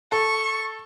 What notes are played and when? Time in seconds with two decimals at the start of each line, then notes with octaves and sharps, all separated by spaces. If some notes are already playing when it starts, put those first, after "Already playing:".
0.12 A4 C#6